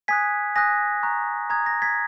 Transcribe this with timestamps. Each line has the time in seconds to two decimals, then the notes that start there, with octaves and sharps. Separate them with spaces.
0.08 G#5 D#6 F#6 G#6 B6
0.56 G#5 D#6 F#6 A#6
1.03 A#5 C#6 F#6
1.50 A#5 D#6 F#6 G#6
1.66 A#6
1.82 G#6 B6